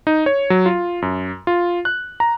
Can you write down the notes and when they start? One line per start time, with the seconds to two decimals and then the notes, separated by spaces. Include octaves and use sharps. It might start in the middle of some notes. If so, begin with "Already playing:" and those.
0.07 D#4
0.26 C#5
0.50 F#3
0.66 F4
1.02 F#2
1.47 F4
1.85 F#6
2.20 A#5